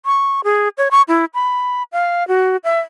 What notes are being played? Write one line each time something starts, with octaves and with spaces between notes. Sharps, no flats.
C#6
G#4
C#5
C#6
E4
B5
F5
F#4
E5